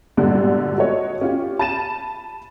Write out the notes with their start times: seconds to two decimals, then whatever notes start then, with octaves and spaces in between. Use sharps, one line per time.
0.17 G#1 E2 G2 A#2 D3
0.78 F#4 A4 C#5 D#5
1.21 C#4 F4 G4
1.59 A5 B5 A6 D#7 E7